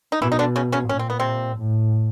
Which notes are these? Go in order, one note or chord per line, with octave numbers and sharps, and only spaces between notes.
D#4
B2 E3 E4
D#4
D3 D4
C#3 C#4
C#3 C#4
A#2 C#4
C4
B3
C3 C4
A2